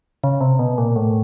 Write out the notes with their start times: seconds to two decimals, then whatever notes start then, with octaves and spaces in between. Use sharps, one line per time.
0.24 C#3
0.41 C3
0.59 B2
0.78 A#2
0.96 A2